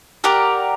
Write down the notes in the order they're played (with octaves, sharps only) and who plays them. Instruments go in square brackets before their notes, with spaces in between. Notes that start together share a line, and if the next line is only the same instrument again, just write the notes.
[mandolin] G4 A#4 D5 F#5